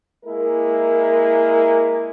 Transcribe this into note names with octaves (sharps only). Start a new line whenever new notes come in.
G#3 A#3 E4 A#4